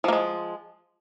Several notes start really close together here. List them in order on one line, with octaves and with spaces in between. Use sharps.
F3 A#3 G#3